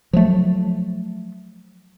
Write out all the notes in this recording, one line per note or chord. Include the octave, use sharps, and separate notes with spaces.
F3 F#3 A3